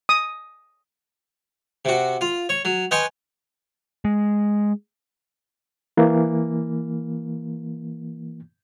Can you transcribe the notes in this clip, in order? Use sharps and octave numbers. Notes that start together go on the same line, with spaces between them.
D#6
C3 F#4
F4
C#5
F#3
B4 C#5 D#5 G5 G#5 C6
G#3
E3 A#3